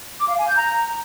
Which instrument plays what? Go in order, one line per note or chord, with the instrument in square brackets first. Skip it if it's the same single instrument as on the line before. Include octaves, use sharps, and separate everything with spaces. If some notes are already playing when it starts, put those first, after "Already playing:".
[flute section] D6
F5
G#5
G6
A#5